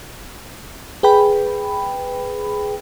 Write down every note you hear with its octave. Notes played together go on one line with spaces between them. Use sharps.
G#4 B4 G5 B5